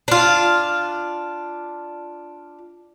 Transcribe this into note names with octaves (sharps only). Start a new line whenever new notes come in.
D4 F4